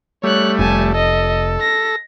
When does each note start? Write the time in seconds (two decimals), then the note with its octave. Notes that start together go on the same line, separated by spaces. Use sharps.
0.24 G3 A3 C#5 F#6
0.59 F1 G#5 A5
0.94 A4 D#5
1.60 A#6